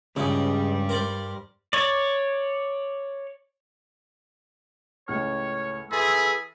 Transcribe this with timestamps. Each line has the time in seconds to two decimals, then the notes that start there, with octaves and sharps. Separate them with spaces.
0.16 C#2 G2 C#3 G3 D#4
0.89 A#4 C5 D5
1.73 C#5 D5
5.08 C#2 A2 C#5 F6
5.91 E3 G#4 A4 B5 C6 E6 A6